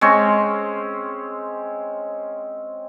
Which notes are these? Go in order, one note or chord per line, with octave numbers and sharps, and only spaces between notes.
G#3 C4 C#4 C#5